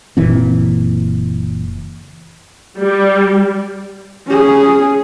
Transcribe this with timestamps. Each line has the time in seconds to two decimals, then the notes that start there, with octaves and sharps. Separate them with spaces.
0.17 F#1 A#2 E3 C4
2.78 G3
4.26 C#4 G#4